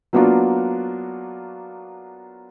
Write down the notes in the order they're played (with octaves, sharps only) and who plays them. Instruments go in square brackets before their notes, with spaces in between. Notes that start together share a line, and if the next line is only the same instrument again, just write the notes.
[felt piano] F#3 A#3 B3 D4 F4 F#4